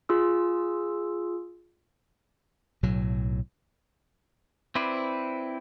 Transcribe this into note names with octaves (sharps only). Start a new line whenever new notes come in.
F4 G#4 E6
B1 A2 F#3
C4 E4 B4 C5 D5